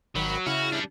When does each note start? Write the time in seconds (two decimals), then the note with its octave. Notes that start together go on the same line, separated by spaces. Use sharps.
0.15 G#1 D#3 F#3 B5
0.46 C#3 E4 F#4 F6
0.72 G3 D4